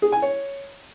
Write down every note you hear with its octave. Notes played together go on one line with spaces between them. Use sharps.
G#4
G#5
C#5